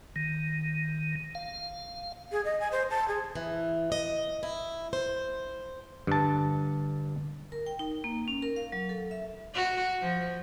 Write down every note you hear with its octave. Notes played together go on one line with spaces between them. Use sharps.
D#3
F5
G#4
D#5
G#5
C5
A5
G#4
E3
D#5
E4
C5
G2 D3 A5
A#4
G5
D#4
A#3
C#4
A#4
F5
F#3
A4
E5
F#4
F3